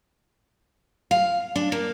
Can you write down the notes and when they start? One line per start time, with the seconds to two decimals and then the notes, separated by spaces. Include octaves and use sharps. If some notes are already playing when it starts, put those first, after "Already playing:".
1.11 F5
1.56 D4
1.72 A#3